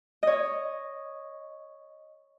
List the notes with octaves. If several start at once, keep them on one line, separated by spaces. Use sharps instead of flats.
C#5 D#5